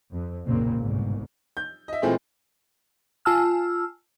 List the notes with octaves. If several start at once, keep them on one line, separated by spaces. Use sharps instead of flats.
F2
F#1 B1 A#2 C#3 A#3 C4
G1 C2 G#2 B2
G6
D#5 E5
A#2 E3 G#3 A3 C4
F4 G#5 A5 E6 F6